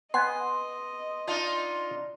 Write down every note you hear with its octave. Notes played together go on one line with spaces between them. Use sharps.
B3 D#5 F#5 G#5 C6
D4 D#4 F4